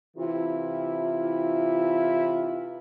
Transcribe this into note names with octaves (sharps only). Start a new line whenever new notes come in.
C3 E3 E4 F4